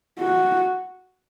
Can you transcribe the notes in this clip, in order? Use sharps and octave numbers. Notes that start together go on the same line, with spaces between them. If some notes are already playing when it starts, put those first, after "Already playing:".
F#4